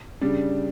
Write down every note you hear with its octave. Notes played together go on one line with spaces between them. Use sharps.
C#3 G3 D4